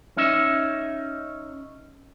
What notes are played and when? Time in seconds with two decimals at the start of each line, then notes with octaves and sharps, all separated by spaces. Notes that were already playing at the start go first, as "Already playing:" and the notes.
0.17 C#4 D#4 E5